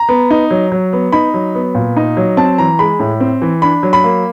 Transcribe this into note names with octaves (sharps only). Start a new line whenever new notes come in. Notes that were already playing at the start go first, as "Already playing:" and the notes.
Already playing: A#5
B3
D#4
F#3
F#3
B3
D#4 B5
F#3
B3
A#2
D#4
F#3
C4 A5
E3 A#5
G#3 B5
A2
C4
E3
D4 B5
F#3
B5
A#3